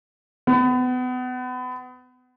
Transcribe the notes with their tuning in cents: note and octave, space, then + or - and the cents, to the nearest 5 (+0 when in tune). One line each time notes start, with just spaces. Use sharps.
B3 +30